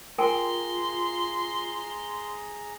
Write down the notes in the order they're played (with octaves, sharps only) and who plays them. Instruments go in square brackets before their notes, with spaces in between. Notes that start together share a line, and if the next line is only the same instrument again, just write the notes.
[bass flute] F4 [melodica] G#4 A#5 [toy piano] A#4 G5 G#5 [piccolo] C6